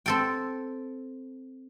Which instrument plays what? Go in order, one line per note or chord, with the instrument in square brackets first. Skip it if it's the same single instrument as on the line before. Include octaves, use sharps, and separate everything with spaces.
[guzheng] C4 A4 G5